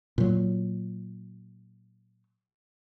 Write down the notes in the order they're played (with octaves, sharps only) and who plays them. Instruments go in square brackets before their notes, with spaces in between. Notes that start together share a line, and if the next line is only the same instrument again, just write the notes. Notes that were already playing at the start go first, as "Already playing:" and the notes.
[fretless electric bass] A#2 F#3